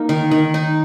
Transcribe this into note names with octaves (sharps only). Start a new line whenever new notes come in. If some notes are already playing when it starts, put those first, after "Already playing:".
Already playing: A#3 D#4
D#3
D#3
D#4